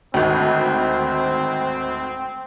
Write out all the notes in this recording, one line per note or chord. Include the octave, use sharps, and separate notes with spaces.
G#1 D2 C4